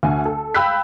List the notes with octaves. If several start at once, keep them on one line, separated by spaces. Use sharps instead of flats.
D2 G#5
A4
F5 G5 B5 E6 F#6 B6